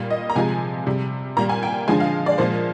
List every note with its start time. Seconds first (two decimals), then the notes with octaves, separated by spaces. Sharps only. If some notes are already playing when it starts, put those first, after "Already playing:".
Already playing: A#2 G3
0.11 D#5
0.30 A#5
0.35 C3 F3 G#3 G#5
0.86 C3 G3
1.37 A#2 G3 A#5
1.49 G#5
1.63 G5
1.88 D3 F3 G#3 G#5
2.00 F5
2.26 D5
2.38 A#2 F3 G#3 C5